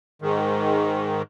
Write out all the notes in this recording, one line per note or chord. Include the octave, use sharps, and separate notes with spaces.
G#2 D#3